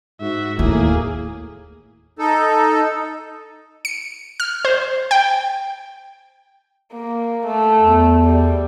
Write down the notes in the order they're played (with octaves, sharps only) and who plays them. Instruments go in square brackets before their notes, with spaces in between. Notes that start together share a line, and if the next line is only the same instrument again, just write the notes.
[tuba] G#2 [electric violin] F#4 E5
[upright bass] D#2 [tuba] A2 [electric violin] A#3 G#4
[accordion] D#4 A4
[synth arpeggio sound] C#7
F6
C5
G5
[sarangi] A#3
A3
[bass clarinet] E2
[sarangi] G3